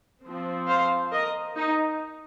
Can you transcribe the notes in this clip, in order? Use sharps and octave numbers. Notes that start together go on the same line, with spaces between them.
F3 C4
C5 F5
A#4 D#5
D#4